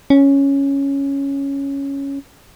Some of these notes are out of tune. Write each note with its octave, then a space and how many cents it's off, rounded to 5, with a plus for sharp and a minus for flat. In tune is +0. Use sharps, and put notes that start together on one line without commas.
C#4 +0